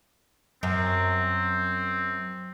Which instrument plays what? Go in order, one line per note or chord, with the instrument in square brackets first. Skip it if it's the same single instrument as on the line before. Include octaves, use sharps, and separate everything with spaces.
[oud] F#2 [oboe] C4